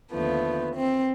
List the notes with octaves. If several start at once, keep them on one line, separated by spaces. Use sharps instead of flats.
D#2 D3 F3 A3 B3
C4